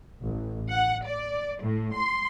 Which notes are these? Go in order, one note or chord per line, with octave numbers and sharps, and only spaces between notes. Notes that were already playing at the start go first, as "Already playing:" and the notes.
A1
F#5
D5
A2
C6